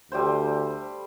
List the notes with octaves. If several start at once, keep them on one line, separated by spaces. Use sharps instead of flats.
D2 G3 A3 C5